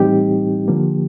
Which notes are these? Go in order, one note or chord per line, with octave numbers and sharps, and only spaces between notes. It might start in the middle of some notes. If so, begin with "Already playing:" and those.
Already playing: A2 E3 G3 C4 D#4 G4
D3 F3 A#3